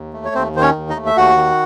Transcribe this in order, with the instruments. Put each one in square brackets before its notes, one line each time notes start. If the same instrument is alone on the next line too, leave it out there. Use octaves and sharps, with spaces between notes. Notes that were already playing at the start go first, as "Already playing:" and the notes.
Already playing: [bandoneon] D#2
A3
C#5
D#2 C4 C5
D#3 C5
C#4 C#5
D#2
D#4 D#5
A3
E5
D#2 F#4 F#5
D#3